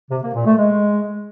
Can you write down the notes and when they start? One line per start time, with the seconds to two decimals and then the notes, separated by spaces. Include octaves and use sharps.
0.11 C3
0.22 A#3
0.34 A#2
0.45 A3
0.57 G#3